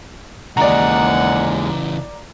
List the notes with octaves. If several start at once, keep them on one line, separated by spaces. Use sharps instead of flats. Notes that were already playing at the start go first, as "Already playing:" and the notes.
D#2 C#3 E3 G#3 D5 F#5 A#5